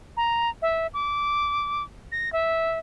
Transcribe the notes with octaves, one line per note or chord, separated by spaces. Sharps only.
A#5
E5
D6
A#6
E5